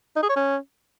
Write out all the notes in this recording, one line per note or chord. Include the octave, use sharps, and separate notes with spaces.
D#4
G#4
C#5
C#4